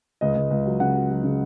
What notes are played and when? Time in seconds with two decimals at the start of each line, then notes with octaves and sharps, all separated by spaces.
0.21 C#2 D#5
0.36 C#2
0.51 C#2
0.66 F#3
0.80 C#3 F#5
0.95 F#3
1.10 F#3
1.24 C#3